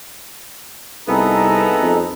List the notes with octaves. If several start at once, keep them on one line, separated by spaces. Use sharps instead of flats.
C2 B3 D#4 G#4 A4 E5 A#5
F2